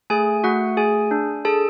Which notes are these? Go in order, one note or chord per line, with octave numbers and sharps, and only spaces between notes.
A3 G#4 G#5
A3 F#4 F#5
G#4 G#5
D4
G#4 A4 A5